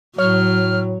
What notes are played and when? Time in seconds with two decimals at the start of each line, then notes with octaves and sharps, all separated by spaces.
0.18 A2 F#3 C#5 F6